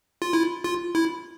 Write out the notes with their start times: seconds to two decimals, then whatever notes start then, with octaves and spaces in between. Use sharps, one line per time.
0.22 F4
0.33 E4
0.64 F4
0.95 E4